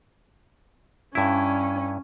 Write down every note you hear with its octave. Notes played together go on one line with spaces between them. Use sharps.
G2 C#4 E4